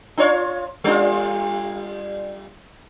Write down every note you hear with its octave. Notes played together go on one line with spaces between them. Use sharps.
D4 F4 C#5
G3 D4 F4